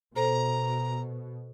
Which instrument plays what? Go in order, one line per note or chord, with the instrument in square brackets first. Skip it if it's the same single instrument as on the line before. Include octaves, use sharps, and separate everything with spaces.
[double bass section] B2 [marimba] A4 C5 [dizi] A#5